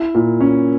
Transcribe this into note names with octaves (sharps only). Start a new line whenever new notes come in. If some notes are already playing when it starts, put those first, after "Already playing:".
Already playing: E4
A#2
C#4